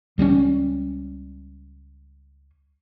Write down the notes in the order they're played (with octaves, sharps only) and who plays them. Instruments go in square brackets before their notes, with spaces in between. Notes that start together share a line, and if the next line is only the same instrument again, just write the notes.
[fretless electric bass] C#2 G3 G#3 C#4